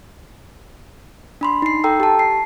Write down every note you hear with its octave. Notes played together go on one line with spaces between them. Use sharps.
D4 B5 C6
D#4 C7
A4 G5 A#5 E6
G4 A5
C7